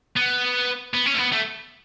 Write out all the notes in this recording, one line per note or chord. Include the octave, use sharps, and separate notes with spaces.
B3
B3
C#4
A3
B3
A3